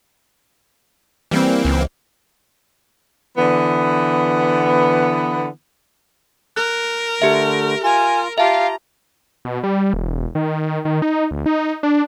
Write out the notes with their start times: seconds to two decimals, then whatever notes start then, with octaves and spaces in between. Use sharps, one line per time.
1.31 E3 G3 A#3 C4
1.65 C#2
3.37 D3 E3 B3
6.56 A#4 F#6
7.22 D3 A3 G4 E5
7.84 F4 A#4 G#5
8.38 F4 G4 E5 F5 A5 A#5
9.45 B2
9.63 G3
9.93 E1
10.35 D#3
10.85 D#3
11.02 D#4
11.31 D2
11.46 D#4
11.83 D4